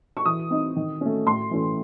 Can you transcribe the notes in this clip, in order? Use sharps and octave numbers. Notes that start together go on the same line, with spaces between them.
C#6
E3 D#6
C4 D#4
D#3
A3 C#4
A2 C6
E3 A3 C#4